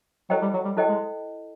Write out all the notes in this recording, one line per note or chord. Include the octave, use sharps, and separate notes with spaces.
F#3 E4 A4 C5 D#5 G5
G3
F#3
G3
F#3 E4 A4 C5 D#5 G5
G#3